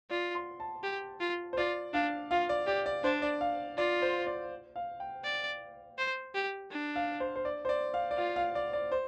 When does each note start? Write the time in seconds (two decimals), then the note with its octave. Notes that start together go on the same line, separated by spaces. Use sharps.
0.10 F4 D5
0.35 C6
0.60 A5
0.83 G4
1.20 F4
1.53 C5
1.58 F4 D5
1.94 D4 F5
2.31 F4 F5
2.49 D5
2.67 G4 D5
2.86 D5
3.04 D4 C5
3.22 D5
3.41 F5
3.78 F4 D5
4.02 C5
4.27 D5
4.76 F5
5.00 G5
5.24 D5
5.98 C5
6.35 G4
6.71 D4
6.96 F5
7.20 C5
7.36 C5
7.45 D5
7.65 C5
7.69 D5
7.94 F5
8.11 D5
8.18 F4 F5
8.36 F5
8.55 D5
8.73 D5
8.92 C5